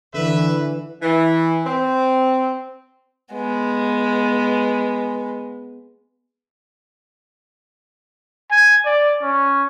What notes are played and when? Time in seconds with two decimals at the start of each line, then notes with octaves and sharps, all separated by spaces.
0.14 D3 E3 B4 E5
1.02 E3
1.66 C4
3.33 G#3 B3
8.51 G#5
8.85 D5
9.23 C#4